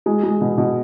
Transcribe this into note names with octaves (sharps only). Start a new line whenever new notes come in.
G#3
G#3
B2
B2